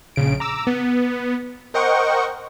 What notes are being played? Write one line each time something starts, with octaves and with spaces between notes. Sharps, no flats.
A#1 C#3 D7
A#5 D6 E6
B3
A#4 C5 D#5 F#5 G5 C#6